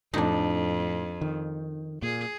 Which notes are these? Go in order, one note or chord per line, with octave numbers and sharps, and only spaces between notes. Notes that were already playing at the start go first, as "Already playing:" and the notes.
F2 A2 D4 D#4
D#3
A#2 G#4